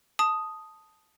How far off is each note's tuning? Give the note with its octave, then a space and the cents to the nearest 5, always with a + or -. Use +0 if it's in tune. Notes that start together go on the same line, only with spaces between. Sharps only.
A5 +0 D#6 +0